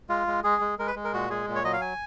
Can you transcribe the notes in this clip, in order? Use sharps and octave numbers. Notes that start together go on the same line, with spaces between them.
G#3 F4
G#3
G#3 G#4
G#3
G#3 A#4
B4
G#3
A#4
A#2 F#4
G#3 G#4
A#2
C#5
F#3 D#5
F5
G#5